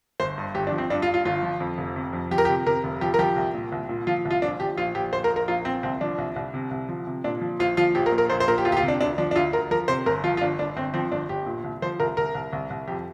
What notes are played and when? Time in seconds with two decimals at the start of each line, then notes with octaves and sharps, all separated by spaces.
0.20 G1 C5
0.38 G2
0.55 G1 G4
0.67 D4
0.72 F3
0.78 C4
0.90 G2 D4
1.02 F4
1.08 G2
1.14 F4
1.25 G1 F4
1.43 F3
1.60 F2
1.78 F1
1.96 C3
2.13 F2
2.31 F3 G4
2.38 A#4
2.45 G4
2.49 C3
2.66 C3 A#4
2.84 F1
3.01 F3 G4
3.14 A#4
3.19 F3 G4
3.36 C2
3.54 A#2
3.72 C2
3.89 A#2
4.07 F3 F4
4.25 C2
4.31 F4
4.42 A#1 D4
4.60 F3 G4
4.77 A#1 F4
4.95 A#1 G4
5.13 A#1 C5
5.24 A#4
5.30 A#1
5.36 A#4
5.48 A#1 F4
5.65 A#1 C4
5.83 C2 C4
6.01 F3 D4
6.18 C2
6.36 C2
6.54 C3
6.71 C2
6.89 F3
7.07 C3
7.24 A#2 D4
7.41 F3
7.60 A#1 F4
7.77 F3 F4
7.95 A#1 G4
8.06 A#4
8.12 A#2
8.18 A#4
8.30 A#1 C5
8.40 C5
8.48 A#2 A#4
8.58 G4
8.65 D2 F4
8.72 G4
8.77 F4
8.83 C3
8.88 D4
9.01 D2 D4
9.18 F3 D4
9.31 D4
9.36 D2 F4
9.53 D2 A#4
9.71 F3 A#4
9.88 C3 C5
10.06 G1 A#4
10.23 F3 F4
10.37 F4
10.41 G1 D4
10.59 G1 D4
10.76 G1 C4
10.94 F3 C4
11.12 G1 D4
11.29 G1 G4
11.46 A#2
11.64 C2
11.82 F3 C5
12.00 C2 A#4
12.17 C2 A#4
12.35 C2
12.53 C2
12.70 C2
12.88 F2 G4